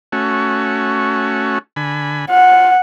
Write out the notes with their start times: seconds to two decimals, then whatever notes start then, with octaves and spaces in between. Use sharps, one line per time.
0.12 A3 C#4 F#4
1.76 D3 G#5 B5
2.30 F4 F#5